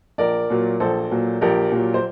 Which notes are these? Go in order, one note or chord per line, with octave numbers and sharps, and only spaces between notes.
A#1 A#4 D5
A#2 F#3
A#1 A4 C5
A#2 F#3
A#1 G4 A#4
A#2 F#3
C5